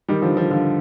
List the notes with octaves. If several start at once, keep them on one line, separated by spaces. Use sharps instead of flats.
D#3 G3
D3 F3
D3 F3
D3 F3